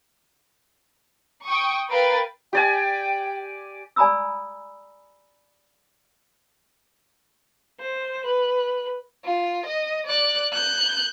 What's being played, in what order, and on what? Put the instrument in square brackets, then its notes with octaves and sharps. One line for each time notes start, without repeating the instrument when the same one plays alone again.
[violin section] G5 C#6 D#6
A#4 B4 F5 G5 A6
[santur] G4 D5 G#5 [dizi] G5
[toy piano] D5 G#5 A#5 B5 D#6 E6
[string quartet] C5
B4
[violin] F4
D#5
D5 F#6
F#6 G6